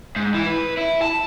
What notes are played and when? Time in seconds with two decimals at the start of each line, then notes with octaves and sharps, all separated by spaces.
0.16 G#2
0.34 E3
0.46 B4
0.77 E4
1.02 A5